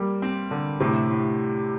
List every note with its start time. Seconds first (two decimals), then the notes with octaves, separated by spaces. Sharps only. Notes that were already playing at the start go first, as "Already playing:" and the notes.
Already playing: G3 A#3
0.22 C4
0.51 D3
0.80 A2 C3
1.10 A2